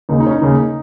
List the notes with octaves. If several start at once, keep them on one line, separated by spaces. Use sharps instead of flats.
D#2 C#3 A#3 D#4
D#4
C#4
D#4
D#2 C#3 A#3